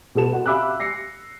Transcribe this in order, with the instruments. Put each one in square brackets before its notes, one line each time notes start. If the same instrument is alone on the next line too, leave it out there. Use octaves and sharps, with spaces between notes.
[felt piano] B2 B3 A4 E7
F#4 F#5
E5 F5 B5 D6 E6 F#6
A#6 C7 C#7